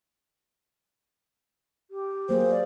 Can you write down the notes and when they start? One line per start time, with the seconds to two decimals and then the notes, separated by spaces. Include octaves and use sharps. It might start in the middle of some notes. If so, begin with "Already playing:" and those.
1.91 G4
2.29 F#3 A#3 G#4 C5
2.51 D5